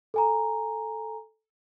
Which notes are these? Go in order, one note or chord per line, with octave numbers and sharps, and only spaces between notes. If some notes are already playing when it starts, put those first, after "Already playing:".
A4 G#5 A#5